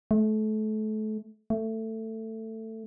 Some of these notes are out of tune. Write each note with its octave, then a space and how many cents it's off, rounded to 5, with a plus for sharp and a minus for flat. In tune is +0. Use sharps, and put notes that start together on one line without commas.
A3 -30
A3 +15